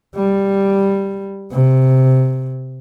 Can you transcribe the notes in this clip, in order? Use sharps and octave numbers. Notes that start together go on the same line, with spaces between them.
G3
C3